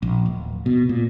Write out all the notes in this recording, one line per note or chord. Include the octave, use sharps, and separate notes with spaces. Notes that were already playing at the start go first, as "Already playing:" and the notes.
A#1
D1
B2
A#2